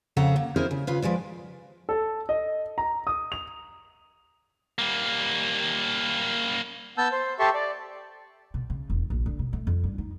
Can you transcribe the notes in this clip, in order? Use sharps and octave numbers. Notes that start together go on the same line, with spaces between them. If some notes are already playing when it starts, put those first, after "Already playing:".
F2 C#3 A4 F#5 A#5
A#3
C#4 E4 G#4 A#4 C5
C#3
C#3 F4 B4
F3 G#3 B4 D5
A4
D#5
A#5
D#6
F7
G3 A#3
B3 A5 E6 G6
C5
G4 A4 E5 A5 C6 C#6
D5
B2
C#3
E1
A#1
D3
B2
A3
F2
G2
D#4